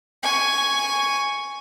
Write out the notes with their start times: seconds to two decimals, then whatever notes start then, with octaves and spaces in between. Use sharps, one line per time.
0.23 G#5 C#6